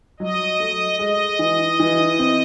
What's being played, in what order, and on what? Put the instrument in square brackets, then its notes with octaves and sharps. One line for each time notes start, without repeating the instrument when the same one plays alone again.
[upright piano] F#3 [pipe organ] D#5
[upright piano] A3
[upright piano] G#3 [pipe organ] D#5
[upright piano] E3
E3
C4